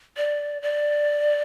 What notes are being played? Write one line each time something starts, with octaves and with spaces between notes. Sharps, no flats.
D5
D5